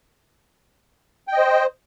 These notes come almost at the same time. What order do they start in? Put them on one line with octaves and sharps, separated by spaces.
G5 D#5 C5